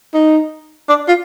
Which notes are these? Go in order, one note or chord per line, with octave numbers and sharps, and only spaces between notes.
D#4
D4
F4